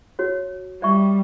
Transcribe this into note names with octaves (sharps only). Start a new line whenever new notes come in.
F#4 C#5
G3 D5 E5 C#6